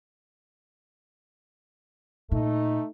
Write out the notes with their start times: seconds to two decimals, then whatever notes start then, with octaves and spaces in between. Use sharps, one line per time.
2.32 A#2 A3 D#4